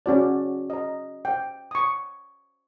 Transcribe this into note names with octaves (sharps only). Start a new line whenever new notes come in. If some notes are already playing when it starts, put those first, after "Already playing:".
C#4 F#4 D5
D#5 A#5
G5
C#6 D#6